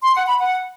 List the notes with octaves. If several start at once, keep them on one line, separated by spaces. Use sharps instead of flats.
C6
F#5
B5
F#5